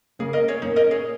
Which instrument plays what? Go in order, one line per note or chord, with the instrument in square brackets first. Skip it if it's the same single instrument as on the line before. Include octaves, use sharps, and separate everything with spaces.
[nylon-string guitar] C#3 A#3 C#4 [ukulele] G#4
[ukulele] A#4 D#5
G#4 C#5
[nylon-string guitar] A#2 A#3 C#4 [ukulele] D#4
[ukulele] A#4 D#5
G#4 C#5